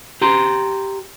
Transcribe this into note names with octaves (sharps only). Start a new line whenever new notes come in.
G4 A#5 C6